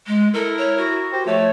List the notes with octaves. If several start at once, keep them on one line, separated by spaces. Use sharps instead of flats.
G#3
E4 A4 A#4
C#5
F#4
G4 C5
F3 A3 C#5